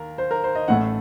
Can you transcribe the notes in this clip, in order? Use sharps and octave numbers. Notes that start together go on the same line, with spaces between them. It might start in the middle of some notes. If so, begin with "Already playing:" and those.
Already playing: D#2 A#4
C5
A#4
C5
D#5
A1 A2 A3 F#5